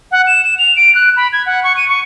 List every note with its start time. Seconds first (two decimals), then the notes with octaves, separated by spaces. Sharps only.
0.12 F#5
0.27 E7
0.45 E7
0.58 F7
0.76 D7
0.95 F#6
1.17 B5
1.33 G#6
1.46 F#5
1.64 C#6
1.77 D#7
1.88 C#6